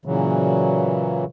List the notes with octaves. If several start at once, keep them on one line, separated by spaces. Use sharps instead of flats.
A#2 C#3 E3 F#3